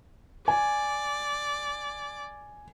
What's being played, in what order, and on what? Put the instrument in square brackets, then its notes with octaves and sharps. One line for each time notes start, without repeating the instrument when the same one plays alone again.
[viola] D5 [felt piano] G#5